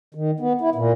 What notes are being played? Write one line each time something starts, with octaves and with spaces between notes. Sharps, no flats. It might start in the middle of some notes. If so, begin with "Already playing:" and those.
D#3
B3
E4
A#2